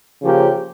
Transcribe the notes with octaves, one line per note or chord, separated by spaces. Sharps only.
C#3 F3 A#3 C#4 G4